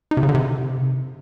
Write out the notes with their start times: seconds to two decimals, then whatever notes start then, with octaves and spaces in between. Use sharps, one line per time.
0.11 D#4
0.17 C3
0.23 C#3
0.29 D3
0.35 C3